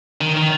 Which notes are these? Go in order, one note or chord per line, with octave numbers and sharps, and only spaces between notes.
D#3
D#3